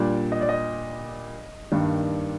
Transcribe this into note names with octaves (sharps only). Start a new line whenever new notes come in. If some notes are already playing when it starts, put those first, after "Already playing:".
Already playing: A#2 G3 D4 D5
D#5
D5
D#5
G2 D#3 G3 A#3 D4